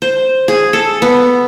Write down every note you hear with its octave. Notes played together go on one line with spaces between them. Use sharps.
C5
G#4
A4
B3